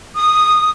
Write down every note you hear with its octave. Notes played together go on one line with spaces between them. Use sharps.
D#6